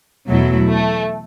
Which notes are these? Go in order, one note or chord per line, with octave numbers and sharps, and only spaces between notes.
E2 B2 F#3 A3 E4
A3